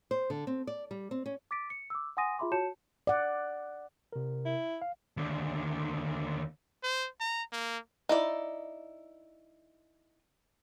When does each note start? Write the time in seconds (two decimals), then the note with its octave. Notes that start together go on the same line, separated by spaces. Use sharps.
0.11 C5
0.30 D3
0.47 C4
0.67 D5
0.91 G3
1.11 C4
1.26 C#4
1.51 D6 A6 B6 D7
1.70 C#7
1.90 D6 E6
2.17 F#5 G#5 C6 D#6 A#6 D#7
2.38 F4 G#4 E5 B5 C6 D6
2.52 F#4 C#5 A5 G6 C#7 E7
3.07 D5 F#5
4.13 C3 A#4
4.45 E4
4.82 F5
5.17 D#2 D3
6.83 C5
7.20 A#5
7.52 A#3
8.09 D#4 E4 D5